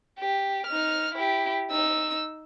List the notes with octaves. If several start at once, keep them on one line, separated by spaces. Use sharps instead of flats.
G4
D#4 F6
E4 G4
D#4 E6